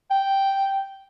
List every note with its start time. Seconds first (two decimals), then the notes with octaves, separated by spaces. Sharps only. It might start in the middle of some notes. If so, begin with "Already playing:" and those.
0.11 G5